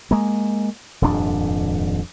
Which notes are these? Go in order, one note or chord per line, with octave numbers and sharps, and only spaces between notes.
G#3 A#3
D#1 F2 G#2 D4